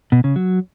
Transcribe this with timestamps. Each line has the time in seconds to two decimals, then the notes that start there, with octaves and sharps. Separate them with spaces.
0.12 B2
0.24 C#3
0.36 F#3